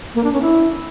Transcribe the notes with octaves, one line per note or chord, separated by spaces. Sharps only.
A#3
D4
C#4
E4